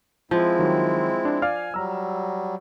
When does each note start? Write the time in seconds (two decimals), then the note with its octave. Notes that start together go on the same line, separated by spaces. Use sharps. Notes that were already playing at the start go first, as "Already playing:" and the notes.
0.31 F3 G#3 C4 E4
0.59 D#3 F#3
1.25 D4
1.42 D5 F5 G#5 F6
1.74 F#3 G3 A#5 E6